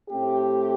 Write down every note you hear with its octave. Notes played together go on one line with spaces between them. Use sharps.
A2 A3 C4 G4